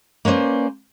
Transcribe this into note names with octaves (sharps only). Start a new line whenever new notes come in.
A#3 C#4 B4 C5 D5